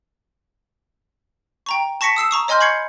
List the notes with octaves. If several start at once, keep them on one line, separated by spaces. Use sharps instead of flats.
G5 A#5 C#6
A5 C#6 A#6 B6 C#7
D#6 E6 C7 E7
A#5 C#6 D#6
C#5 D#5 G#5 C6 F6 G6
B5 C#6 G6 G#6 C7 C#7